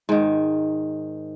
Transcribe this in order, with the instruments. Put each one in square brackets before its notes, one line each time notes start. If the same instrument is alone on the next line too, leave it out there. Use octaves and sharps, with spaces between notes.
[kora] G#2 D#3